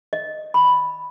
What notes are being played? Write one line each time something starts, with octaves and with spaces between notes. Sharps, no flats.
D#5
B5